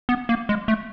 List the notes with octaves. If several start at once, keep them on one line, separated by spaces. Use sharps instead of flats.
B3
A#3
G#3
A3